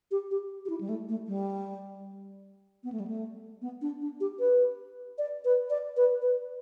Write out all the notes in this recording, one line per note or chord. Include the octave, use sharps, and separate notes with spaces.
G4
G4
G4
E4
G3
A3
A3
G3
B3
A3
G3
A3
B3
D4
D4
G4
B4
D5
B4
D5
B4
B4